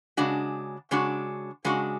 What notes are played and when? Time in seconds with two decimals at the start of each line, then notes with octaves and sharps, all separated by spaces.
0.17 C#3 G#3 D4 F#4
0.91 C#3 G#3 D4 F#4
1.65 C#3 G#3 D4 F#4